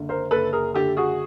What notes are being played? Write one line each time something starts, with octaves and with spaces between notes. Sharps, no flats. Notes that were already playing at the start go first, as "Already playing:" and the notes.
Already playing: F#1 D3
A#4 C5
F#1 A4 B4
G#4 A#4
D3 G4 A4
F#4 G#4